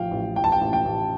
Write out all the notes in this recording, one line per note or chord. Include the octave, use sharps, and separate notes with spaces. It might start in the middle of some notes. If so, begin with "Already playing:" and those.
Already playing: A1 F3 F5 G5
A1
A1 G5
A5
G5
A1
G5
A1